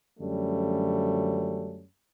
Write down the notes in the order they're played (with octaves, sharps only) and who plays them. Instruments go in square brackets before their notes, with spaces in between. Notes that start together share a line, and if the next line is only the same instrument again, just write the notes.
[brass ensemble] F#2 D3 F3 G3 A3 C#4